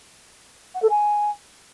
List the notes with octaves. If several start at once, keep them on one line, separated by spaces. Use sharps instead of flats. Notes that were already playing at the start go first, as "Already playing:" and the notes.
F#5
A4
G#5